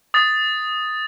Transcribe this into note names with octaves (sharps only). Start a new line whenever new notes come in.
D#6 A6